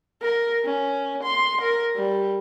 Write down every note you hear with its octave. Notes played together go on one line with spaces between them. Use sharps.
A#4
C#4
C6
A#4
G3